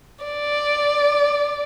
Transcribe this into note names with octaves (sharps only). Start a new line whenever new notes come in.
D5